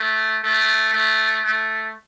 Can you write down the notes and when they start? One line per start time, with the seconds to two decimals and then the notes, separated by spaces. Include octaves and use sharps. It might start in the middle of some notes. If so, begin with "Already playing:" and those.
Already playing: A3
0.43 A3
0.94 A3
1.45 A3